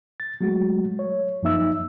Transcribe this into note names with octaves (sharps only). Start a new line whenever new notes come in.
A6
F#3 G#3 A3 F#4
C#5
F#2 F3 A#3 D#4 E5 E6